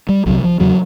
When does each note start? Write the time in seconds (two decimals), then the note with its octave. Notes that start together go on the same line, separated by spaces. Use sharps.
0.09 G3
0.26 C2 C3 F#3
0.43 F3
0.60 E2 C#3 F#3